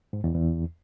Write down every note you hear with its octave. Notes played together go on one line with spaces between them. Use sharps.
G#2
E2
E2